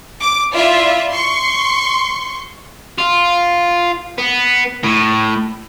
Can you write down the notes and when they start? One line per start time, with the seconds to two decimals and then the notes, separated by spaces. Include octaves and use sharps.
0.20 D6
0.53 E4 F4 D5 E5
1.11 C6 C#6
2.98 F4
4.18 B3
4.84 A2